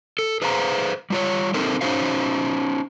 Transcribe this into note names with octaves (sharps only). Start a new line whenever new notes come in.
A4
G#4 B4 C5 F5 F#5 A#5
G3 F4 C#5
C4 D#4 A4 A#4 C5
C#4 D#4 F#4 C5 F5